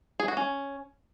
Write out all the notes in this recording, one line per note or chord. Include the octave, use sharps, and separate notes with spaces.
G#4
F#4
C#4